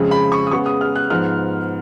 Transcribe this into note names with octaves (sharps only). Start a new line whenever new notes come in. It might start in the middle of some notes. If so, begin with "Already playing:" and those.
Already playing: F2 C#3 G#3
B5
C#6
D#6
C#3 G#3 B3 C#6
D#6
F6
F#6
G#2 F3 B3 F6